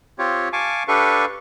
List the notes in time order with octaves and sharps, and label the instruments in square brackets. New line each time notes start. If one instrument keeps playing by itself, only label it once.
[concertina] C4 F4 G4 C#5
F5 G#5 A5 C#6 D6
D4 G4 A4 B4 F5 C#6